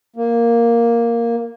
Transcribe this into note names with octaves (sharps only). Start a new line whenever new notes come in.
A#3